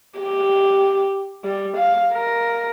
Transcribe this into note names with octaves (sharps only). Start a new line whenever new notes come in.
G4
G3
F5
A#4